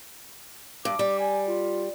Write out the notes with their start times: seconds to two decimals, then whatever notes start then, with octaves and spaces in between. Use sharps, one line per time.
0.85 G2 D6
0.99 G3
1.20 G#5
1.48 F4